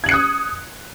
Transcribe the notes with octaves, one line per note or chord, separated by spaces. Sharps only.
D#6 F#6 G#6 C#7 F#7